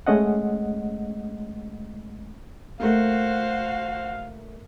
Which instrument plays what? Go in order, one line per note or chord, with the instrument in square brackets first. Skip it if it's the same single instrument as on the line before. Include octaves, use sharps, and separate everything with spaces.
[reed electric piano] G#3 A3 C#4 D#5 F#5
[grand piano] A3 A#3 [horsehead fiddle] F#4 C5 [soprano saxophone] F5